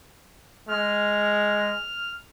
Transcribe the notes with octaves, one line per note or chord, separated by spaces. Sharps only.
G#3 F6